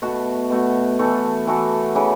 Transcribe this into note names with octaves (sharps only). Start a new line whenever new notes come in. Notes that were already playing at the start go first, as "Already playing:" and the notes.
B2 A3 F#4
B2 A3 F#4
E3 A3 F#4 A4
E3 A3 F#4 A4
C#3 E3 B3